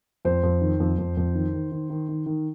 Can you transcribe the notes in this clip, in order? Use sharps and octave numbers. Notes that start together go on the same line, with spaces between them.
F2 C5
F2
D#3
F2
F2
F2
D#3
D#3
D#3
D#3
D#3
D#3